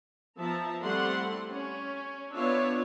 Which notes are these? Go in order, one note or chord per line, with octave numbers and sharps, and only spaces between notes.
F3 B3 E5 A5 A#5
G3 A3 C4 E4 F#5 C6
C#4
B3 D4 F4 C#5 E5